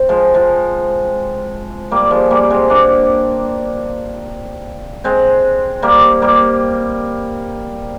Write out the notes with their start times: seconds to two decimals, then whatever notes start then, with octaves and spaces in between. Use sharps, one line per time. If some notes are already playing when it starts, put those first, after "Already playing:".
Already playing: C4
0.09 F3 G#3
0.34 F3 G#3
1.91 G3 A#3
2.11 F3 G#3
2.30 G3 A#3
2.50 G#3 C4
2.70 A#3 D4
5.04 G#3 C4
5.82 G3 A#3
6.22 G3 A#3